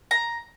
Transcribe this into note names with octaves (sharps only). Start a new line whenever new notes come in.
A#5